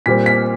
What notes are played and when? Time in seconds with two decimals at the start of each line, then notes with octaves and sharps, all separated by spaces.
0.06 A#2 G3 C4 B6
0.26 B6